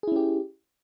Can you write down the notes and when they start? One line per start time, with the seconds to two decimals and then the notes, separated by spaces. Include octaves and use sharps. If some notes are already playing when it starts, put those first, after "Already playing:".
0.03 G#4
0.07 E4
0.12 C#4
0.16 G4